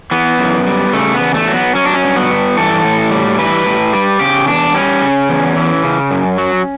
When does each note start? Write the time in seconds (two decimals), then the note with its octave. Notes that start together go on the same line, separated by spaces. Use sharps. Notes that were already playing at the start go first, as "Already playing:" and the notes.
0.11 E3 B3
0.39 F#2
0.67 G3
0.93 C#3 A3
1.14 B3
1.20 E2
1.34 A3
1.48 F#3
1.55 B3
1.75 F#3 C#4
1.85 D4
1.94 C#4
2.03 G2
2.16 B3
2.30 G2
2.57 E3 A4
2.84 A2
3.11 G3
3.38 E3 B4
3.66 A2
3.93 G3
4.20 C#3 G4
4.47 E2 D4
4.74 G3 C#4
5.02 C#3
5.29 E2
5.56 E3
5.84 C#3
6.11 F#2
6.38 F#3